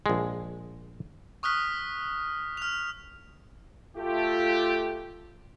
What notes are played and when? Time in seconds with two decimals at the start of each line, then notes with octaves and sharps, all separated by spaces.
0.06 A#1 G#3
1.43 C#6 D#6 F6 F#6 B6
2.57 F6 F7
3.96 A3 F4 G4